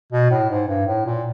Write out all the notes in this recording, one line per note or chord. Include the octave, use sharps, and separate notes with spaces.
B2
A2
G#2
G2
A2
A#2